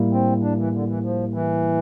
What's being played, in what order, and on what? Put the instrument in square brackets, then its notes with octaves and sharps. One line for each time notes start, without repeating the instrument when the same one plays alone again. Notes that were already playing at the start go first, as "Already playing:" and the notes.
Already playing: [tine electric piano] A2 G3 A#3 E4
[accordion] C4
D4
E3
D3
E3
F3
E3